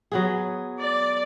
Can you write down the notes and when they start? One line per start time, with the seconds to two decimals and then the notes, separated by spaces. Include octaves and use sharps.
0.12 F#3 B3 G#4
0.80 D5